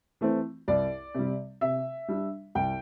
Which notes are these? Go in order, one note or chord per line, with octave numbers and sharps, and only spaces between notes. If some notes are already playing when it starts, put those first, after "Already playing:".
E3 A3 C4
C2 D5
C3 G3
C3 E5
G3 D4
C2 G5